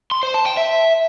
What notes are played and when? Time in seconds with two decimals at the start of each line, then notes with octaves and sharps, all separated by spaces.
0.11 C6
0.23 C5
0.34 A5
0.46 G5
0.57 E5